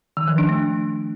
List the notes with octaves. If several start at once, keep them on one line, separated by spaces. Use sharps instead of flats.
D#3
F3
D4
A3